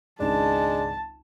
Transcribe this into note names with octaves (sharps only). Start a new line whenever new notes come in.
G#1 C#2 G#3 D4 A5 E7